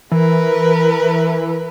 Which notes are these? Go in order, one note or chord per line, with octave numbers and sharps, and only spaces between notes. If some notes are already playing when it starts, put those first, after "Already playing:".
E3 A#4 B4